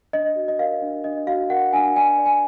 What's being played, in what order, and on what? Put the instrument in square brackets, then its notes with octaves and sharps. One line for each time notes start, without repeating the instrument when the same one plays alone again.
[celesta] D4 D#5
F#4
D#5
A#4 F5
D4
D4 D#5
F#4 F5
A#4 F#5
D4 G#5
D5 G#5
D5
G#5